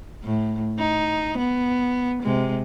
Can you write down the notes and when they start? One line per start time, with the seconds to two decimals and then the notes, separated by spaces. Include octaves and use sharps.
0.24 A2
0.79 D#4
1.37 B3
2.23 C3 G#3